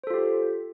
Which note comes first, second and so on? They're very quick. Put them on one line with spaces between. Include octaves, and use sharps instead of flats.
C5 A4 F4 G4